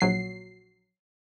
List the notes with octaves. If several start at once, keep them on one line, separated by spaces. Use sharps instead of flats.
A#1 F#3 C7